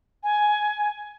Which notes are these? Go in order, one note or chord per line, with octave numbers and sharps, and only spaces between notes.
G#5